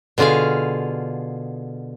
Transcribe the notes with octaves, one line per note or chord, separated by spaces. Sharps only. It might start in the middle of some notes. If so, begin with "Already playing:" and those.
B2 D3 F4 G#4 F5